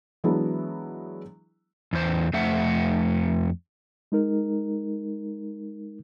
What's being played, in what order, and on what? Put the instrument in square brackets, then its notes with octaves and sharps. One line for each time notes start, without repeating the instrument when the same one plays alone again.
[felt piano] E3 F#3 G#3 B3 D4 E4
[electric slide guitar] E2 C5
F2 A3 C5 E5 F#5
[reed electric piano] G#3 D#4 A#4